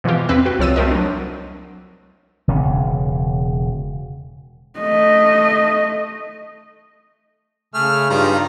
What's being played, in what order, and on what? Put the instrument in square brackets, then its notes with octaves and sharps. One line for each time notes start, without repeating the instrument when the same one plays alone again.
[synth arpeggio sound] B2 E3 F3 F4 G4
E2 C4 B4 E6
F#4 B4 G5
C2 F3 C#5 E6 A6 D#7
A3 C4 A#4 D#5
F#3 D4
[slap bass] E1 C#3 C#4
[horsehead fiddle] A3 D#5
[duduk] C#3 [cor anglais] A3 [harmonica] G#4 F6
[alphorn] G2 [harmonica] D#3 G3 A#5 [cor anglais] F4